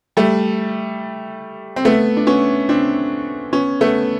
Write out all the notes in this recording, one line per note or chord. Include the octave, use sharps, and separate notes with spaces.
G3 A3
C4
A3 B3
D4
B3 C#4
C4 D4
B3 C#4
A3 B3